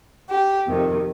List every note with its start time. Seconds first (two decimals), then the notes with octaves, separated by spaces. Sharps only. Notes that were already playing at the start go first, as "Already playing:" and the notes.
0.30 G4
0.67 F2 C3 D#3